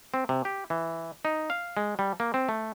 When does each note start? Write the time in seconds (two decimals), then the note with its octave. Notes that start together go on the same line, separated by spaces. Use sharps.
0.14 C4
0.29 C3
0.45 G4
0.70 E3
1.25 D#4
1.50 F5
1.77 G#3
1.99 G3
2.20 A#3
2.34 C4
2.49 A3